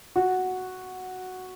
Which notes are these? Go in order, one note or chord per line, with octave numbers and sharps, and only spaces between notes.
F#4